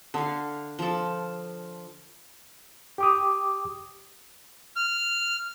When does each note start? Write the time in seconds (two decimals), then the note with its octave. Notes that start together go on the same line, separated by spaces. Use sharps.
0.14 D3 F5
0.79 F3 A4
2.98 G4 D6 D#6
4.76 F6